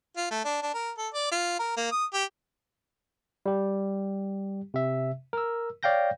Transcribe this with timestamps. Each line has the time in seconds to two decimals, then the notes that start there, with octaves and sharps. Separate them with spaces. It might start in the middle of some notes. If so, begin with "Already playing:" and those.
0.17 F4
0.31 A3
0.45 D4
0.63 D4
0.74 A#4
0.98 A4
1.14 D5
1.31 F4
1.59 A#4
1.77 A#3
1.91 D#6
2.13 G4
3.46 G3 G4
4.74 C3 E5
5.33 A#4 E6
5.83 C#5 D5 F5 G5 G6 A#6